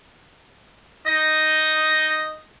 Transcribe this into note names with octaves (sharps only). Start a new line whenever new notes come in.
D#4 D#5